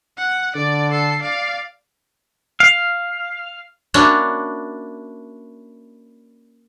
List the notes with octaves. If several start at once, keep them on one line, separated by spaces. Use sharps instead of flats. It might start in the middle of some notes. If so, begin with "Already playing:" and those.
F#5
D3 D5
A4 C7
D5 F5
F5
A#3 C#4 D4 E4 F#4